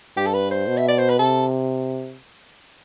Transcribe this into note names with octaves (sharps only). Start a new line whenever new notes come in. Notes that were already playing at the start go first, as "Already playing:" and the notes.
G2 G4
A4
B4
C5
B2
E5
D5
C5
B4
C3 A4